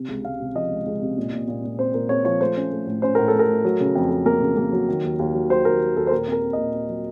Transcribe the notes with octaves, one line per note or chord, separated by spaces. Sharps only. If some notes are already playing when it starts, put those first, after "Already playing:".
Already playing: C3
C#2
C#2 F5
C3
F3 D#5
C#2
C#2
C3
A#2
A#2
A#2
A#2
C4 C5
A#2 A#4
C4 C#5
F3 C#5
A3 C5
C#4
A3
A2
C#4 C5
A2 A#4
A4
A2
A#4
A3
F#3
C#3
F2
F2
A#3 A#4
C#3
A#3
F#3
D#3
D#2
D#2
F#3
F#3 C5
D#2 A#4
F#3
D#2 A4
C5
A#2 A#4
C4 A#4
C4
A#2 D#5
C4
F#3